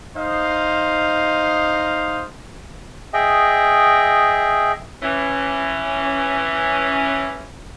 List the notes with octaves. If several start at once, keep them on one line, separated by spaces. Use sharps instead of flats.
D#4 C5 D#5 F5
G#4 D#5 E5 G5
E3 C#4